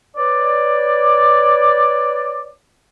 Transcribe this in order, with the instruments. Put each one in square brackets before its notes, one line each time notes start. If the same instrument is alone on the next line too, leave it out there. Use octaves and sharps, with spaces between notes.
[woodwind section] B4 C#5 D5